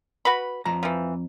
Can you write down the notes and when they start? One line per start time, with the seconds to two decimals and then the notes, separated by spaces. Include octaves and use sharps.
0.25 F#4 B4 B5
0.65 F2 A#5
0.83 E3 F3